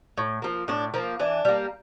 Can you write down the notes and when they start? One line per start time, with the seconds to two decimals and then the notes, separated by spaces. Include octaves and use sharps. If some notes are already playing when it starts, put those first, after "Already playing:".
0.18 A2
0.42 F3 A#3
0.68 A2 D4
0.94 F3 A#3
1.19 E3 D4
1.45 G3 A#3